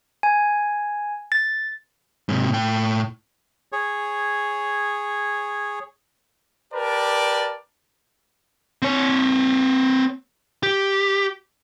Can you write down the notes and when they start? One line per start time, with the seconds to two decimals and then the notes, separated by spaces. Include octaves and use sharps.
0.23 G#5
1.32 A6
2.29 G#2 C3
2.50 A2 G5
3.72 G#4 C#5
6.73 G4 A#4 B4 D5 A5
8.82 C4 C#5
10.63 G4